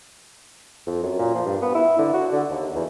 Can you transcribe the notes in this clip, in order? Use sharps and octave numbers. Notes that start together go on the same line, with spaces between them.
F2
F#2
A#2
F3
G2
B3
E4
D3
F#4
D3
D#2
E2